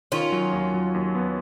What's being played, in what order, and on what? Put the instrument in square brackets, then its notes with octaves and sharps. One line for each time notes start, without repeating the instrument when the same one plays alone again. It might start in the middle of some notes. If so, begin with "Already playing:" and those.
[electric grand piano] D#3 [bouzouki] C#4 F4
[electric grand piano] F#3
D#2
F#3
D#2
B3